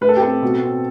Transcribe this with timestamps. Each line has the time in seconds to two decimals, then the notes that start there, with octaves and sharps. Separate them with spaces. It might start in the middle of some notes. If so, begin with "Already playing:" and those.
0.01 A2 B4
0.09 A4
0.16 G4
0.22 C4 A4
0.42 B2
0.63 C4